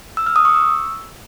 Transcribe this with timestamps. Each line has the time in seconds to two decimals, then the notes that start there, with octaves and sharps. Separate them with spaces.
0.17 E6
0.26 F6
0.36 D#6
0.45 C#6
0.54 E6